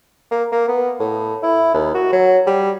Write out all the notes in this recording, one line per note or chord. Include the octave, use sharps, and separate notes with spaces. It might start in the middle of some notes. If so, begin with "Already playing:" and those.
A#3
A#3
B3
A2
E4
D#2
F#4
F#3
G3